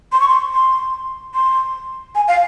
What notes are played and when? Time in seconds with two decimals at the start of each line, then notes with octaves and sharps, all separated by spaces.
0.12 C6
0.20 C#6
0.29 C6
0.53 C6
1.34 C6
2.15 G#5
2.28 F5